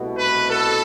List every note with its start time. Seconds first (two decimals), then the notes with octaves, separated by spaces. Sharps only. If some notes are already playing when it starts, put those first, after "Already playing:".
Already playing: C2 B2 A3
0.16 B4
0.49 A4